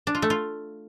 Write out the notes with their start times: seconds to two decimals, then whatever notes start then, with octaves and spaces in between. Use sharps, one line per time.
0.07 D4
0.15 F4
0.22 A3
0.30 F4